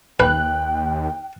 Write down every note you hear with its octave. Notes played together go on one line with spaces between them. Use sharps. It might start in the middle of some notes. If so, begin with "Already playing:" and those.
D#2 B4 G5 F#6